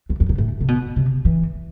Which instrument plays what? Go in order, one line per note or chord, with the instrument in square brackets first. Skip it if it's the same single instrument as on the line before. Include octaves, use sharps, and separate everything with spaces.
[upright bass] E2
F2
G#2
A2
C3
B2
C3
E3